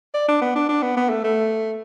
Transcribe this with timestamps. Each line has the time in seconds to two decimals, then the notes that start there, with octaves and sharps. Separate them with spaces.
0.14 D5
0.28 D4
0.41 B3
0.55 D4
0.69 D4
0.82 B3
0.97 B3
1.10 A3
1.24 A3